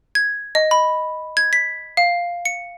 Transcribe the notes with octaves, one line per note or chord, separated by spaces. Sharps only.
G#6
D#5
B5
G#6
B6
F5
C#7